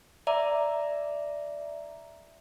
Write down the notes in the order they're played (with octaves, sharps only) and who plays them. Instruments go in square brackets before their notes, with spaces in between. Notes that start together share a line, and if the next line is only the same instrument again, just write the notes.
[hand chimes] D5 E5 A#5